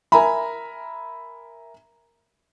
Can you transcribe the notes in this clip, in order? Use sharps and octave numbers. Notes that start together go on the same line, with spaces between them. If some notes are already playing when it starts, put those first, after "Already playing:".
A#4 E5 G#5 A#5 B5